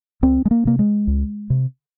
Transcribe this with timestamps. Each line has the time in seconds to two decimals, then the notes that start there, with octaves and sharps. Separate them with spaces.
0.22 C#2 C4
0.45 G#3
0.51 A#3
0.65 C3 A#3
0.79 G#3
1.07 C#2
1.50 C3